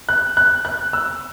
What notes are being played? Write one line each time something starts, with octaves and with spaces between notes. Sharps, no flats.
F#6
F#6
F#6
E6